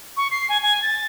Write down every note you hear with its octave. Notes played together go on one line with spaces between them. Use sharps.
C#6
C7
G#5
G#5
A6